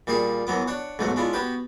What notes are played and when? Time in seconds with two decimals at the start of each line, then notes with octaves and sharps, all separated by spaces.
0.07 A#2 G3 A#3 G#4 F5 C#6
0.47 F#2 E3 F#3 B3 D6
0.68 D4 C#5 F#5
0.99 B1 G#2 F#3 A3 F#5
1.16 G#3 C#4 D4 E4 F4
1.33 B3 F#4 G4 B4